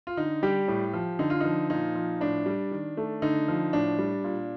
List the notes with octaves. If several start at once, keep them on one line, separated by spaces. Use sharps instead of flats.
F4
D3 D#4
G3 G4
A2
F3
D3 D#4
F4
F3 D#4
A#2 D#4
F3
A2 D4
G3
D#3
A3
D3 D#4
F3
A2 D4
G3
A#2